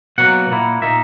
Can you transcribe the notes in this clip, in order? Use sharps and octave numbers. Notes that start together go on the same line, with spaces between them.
B2 F#3 A#3 F#5
A#2 A#3 E4
A#2 A#3 D#4 E5